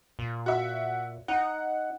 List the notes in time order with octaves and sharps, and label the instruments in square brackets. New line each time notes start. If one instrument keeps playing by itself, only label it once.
[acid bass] A#2
[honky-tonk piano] F#4 E5
[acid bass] D#4 [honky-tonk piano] F#5